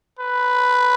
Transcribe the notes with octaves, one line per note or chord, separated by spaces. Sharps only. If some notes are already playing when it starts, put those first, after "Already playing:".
B4